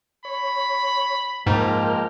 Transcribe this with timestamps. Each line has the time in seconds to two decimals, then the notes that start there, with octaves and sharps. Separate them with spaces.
0.25 C#5 B5
1.47 G#2 F3 G#3 A#3 A#4 G5 F6